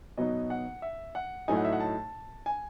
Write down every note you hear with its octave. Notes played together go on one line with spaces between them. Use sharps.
B2 F#3 B3 D#4 D#5
F#5
E5
F#5
A2 F#3 A3 D#4 G#5
F#5
E5
F#5
A5
G#5